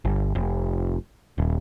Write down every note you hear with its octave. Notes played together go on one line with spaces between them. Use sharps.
G1
F1
D#1